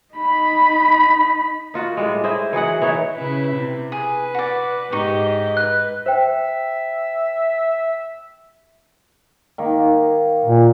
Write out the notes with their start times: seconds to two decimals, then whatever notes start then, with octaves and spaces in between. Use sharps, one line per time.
0.14 D#4 B5
1.74 D#4 F4 F#4
1.97 A2 G3 G#3
2.24 E4 G#4 C5 D#5
2.53 E3 F#3 G#4 F#5
2.82 E3 D#4 C#5
3.15 C#3 E4 B4
3.56 C3
3.92 G#4 B4
4.34 F#4 D5
4.92 G#2 D#4 G4 D#5 C#6
5.57 B4 F#6
6.06 C5 E5 G5
9.58 D#3 A#3
10.45 A#2